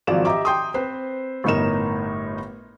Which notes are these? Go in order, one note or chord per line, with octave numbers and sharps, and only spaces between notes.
G#1 F3 F#3 D5 E7
G4 D#5 E5 A#5 D6
G5 C6 D#6
C4 B4 C5
G1 A2 D#4 A#4 E7